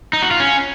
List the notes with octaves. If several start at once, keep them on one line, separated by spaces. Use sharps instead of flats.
D#4
F#4
F4
C#4